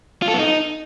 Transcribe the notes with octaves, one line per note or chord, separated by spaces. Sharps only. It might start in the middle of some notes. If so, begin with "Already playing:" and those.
F4
A4
B3
D#4